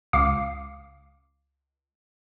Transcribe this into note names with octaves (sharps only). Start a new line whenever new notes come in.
C#2 F5 D6 C7